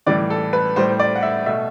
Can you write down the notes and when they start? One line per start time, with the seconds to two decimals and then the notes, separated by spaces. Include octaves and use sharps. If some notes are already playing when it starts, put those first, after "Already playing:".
0.07 A2 E3 G3 D5
0.30 A4
0.53 B4
0.76 A2 G3 C5
0.89 C5
1.00 D5
1.16 F#5
1.23 E5
1.46 B2 A3 E5